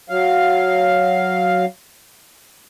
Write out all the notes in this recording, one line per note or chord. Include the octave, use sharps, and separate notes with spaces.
F#3 F5